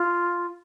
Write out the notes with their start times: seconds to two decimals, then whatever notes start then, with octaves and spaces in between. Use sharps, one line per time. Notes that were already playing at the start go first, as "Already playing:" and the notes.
Already playing: F4